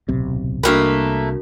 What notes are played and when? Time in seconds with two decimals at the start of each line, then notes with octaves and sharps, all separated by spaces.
0.09 D1 B1 C3
0.63 C2 A3 A#3 D4 F#4 A#4 B4